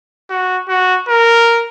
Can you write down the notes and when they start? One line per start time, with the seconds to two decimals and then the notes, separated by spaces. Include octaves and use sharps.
0.30 F#4
0.69 F#4
1.08 A#4